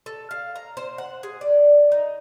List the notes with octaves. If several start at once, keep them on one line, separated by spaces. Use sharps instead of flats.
A4
F5
A#5
C5
F#5
G#4
D5
D#4